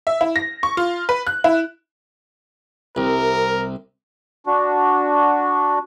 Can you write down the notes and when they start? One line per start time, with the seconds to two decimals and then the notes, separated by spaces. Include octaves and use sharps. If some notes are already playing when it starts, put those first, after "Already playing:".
0.07 E5
0.21 E4
0.36 A#6
0.63 C#6
0.77 F4
1.09 B4
1.27 F#6
1.44 E4
2.96 C2 A#4
4.47 D4 F#4